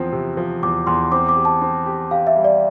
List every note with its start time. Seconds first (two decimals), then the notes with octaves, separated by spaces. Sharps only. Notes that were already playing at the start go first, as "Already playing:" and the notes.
Already playing: E2 F3 C4
0.13 C3
0.37 F3
0.63 E2 D6
0.87 E2 C6
1.12 C4 D6
1.29 D6
1.36 G4
1.45 A5
1.62 C4
1.86 G4
2.11 G4 F5
2.27 E5
2.36 G3
2.44 D5